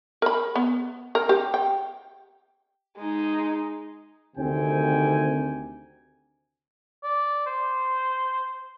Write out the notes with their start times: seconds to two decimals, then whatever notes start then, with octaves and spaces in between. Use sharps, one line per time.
0.22 A#4 B5
0.56 B3
1.15 A#4
1.29 G4
1.54 G5
2.98 G#3 D#4
4.36 D2 C3 D#3 C4 G5 G#5
7.04 D5
7.46 C5